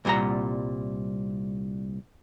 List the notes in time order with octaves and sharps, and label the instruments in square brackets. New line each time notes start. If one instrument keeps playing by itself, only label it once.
[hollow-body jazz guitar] C2 A#2 G3 F#5 A#5